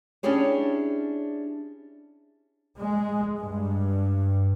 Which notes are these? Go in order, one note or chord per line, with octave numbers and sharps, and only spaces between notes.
C#4 D4 E4 G4 G#4 C#5
G#3
G2